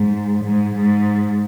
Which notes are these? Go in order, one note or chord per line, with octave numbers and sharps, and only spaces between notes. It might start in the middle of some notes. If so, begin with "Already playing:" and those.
Already playing: G#2
G#2
G#2